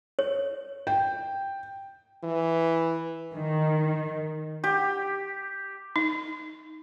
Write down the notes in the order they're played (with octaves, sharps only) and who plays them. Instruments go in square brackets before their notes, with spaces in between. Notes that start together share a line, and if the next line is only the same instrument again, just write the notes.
[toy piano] C#5
[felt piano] G5
[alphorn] E3
[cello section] D#3
[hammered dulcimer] G4
[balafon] D#4